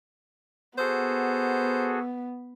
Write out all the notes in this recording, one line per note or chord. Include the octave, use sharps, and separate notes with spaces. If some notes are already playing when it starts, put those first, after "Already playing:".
B3 F#4 G#4 A4 C5